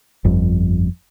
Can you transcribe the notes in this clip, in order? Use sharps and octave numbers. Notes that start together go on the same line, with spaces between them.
G1 F2